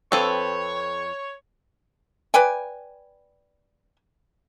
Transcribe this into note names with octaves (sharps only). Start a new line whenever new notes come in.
F2 C4 A4 B4 C#5
B4 D5 G5 G#5